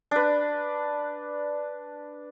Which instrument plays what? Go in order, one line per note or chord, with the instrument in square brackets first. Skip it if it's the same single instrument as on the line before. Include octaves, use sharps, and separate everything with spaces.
[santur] D4 B4